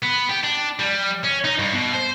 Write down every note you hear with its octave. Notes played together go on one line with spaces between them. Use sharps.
B3
G4
D4
G3
C#4
D#4
G2
B2
C5